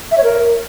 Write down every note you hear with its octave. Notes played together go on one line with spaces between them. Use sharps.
E5
C#5
A#4